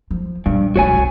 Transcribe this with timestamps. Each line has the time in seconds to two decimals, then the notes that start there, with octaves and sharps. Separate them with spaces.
0.11 F3
0.46 G2 A#2 F3
0.76 B1 A3 F#4 C#5 G#5
0.93 C2 D4